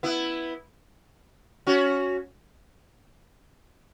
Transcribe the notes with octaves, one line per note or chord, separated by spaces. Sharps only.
B3 E4
C#4 F#4